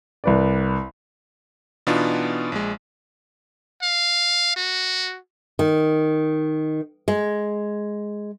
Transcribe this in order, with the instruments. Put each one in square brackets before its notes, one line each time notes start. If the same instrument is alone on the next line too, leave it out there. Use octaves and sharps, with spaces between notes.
[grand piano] C2 B4 D5
[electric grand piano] B2 E3 B3 D4 D#4 F4
A#1 G#3
[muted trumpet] F5
F#4
[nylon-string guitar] D#3
G#3